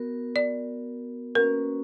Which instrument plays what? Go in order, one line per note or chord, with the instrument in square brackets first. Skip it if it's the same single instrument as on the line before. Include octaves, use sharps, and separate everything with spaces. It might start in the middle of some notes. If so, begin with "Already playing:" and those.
Already playing: [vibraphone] B3 F#4 A#4
[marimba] D5
[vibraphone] A#3 C#4 F#4 B4 [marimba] A#4